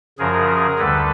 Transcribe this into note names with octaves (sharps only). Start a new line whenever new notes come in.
F#2 C#3 F3 G#4 A#4
D2 D3 G3 A4 B4